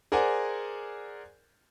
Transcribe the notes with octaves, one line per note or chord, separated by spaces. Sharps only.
G#4 A#4 C5 D5 F#5 G#5